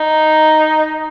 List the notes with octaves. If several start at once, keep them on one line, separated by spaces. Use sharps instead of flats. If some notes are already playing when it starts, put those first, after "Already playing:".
Already playing: D#4